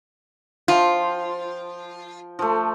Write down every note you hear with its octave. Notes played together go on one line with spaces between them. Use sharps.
F3 F4 G5
F3 A3